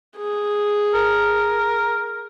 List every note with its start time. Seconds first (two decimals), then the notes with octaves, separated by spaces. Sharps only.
0.17 G#4
0.94 A#4